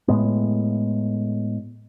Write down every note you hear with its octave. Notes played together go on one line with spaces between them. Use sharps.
A2 G#3 B3